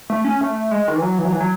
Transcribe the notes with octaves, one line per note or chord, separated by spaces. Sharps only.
A3
C#4
A3
G#3
D#3
E3
F#3
E3
F#3
E3
F#3